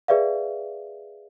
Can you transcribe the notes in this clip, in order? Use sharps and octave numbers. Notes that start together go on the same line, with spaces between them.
G#4 B4 D5 E5 F5